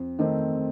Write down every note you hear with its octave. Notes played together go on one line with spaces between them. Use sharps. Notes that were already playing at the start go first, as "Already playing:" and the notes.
Already playing: F2
D#3 A3 C4